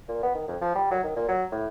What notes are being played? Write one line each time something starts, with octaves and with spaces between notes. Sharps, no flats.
A#2
B3
D#3
F2
F3
G3
F#3
D#3
A#2
F#3
A2